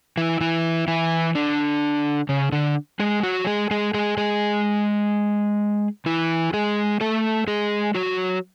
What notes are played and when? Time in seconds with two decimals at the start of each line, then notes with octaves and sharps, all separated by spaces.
0.17 E3 E4
0.41 E3 E4
0.88 E3 E4
1.35 D3 D4
2.29 C#3 C#4
2.52 D3 D4
2.99 G#3 G#4
3.23 F#3 F#4
3.47 G#3 G#4
3.71 G#3 G#4
3.94 G#3 G#4
4.17 G#3 G#4
6.06 E3 E4
6.53 G#3 G#4
7.01 A3 A4
7.47 G#3 G#4
7.94 F#3 F#4